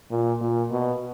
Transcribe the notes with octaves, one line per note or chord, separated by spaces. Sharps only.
A#2
A#2
B2